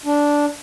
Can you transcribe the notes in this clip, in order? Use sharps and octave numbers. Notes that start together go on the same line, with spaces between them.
D4